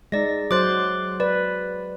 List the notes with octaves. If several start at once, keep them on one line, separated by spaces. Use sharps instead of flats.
G#3 D#4 D5 A#6
F#3 C5 D6 F#6 A6
B4 D5